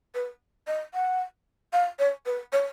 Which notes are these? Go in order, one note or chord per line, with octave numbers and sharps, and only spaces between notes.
B4
D#5
F#5
F5
C#5
B4
C#5